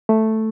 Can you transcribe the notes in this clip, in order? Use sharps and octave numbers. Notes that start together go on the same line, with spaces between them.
A3